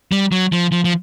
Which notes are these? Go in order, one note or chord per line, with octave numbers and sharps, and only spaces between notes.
G3
F#3
F3
F3
F3